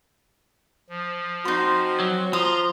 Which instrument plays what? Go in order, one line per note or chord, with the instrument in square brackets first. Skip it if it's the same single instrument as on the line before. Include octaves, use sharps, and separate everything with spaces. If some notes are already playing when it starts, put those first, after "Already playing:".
[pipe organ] F3
[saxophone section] C4 F#4 [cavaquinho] D#4 C6
[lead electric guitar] F#3
[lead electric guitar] F3 [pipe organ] A#5 C6 [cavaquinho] D#6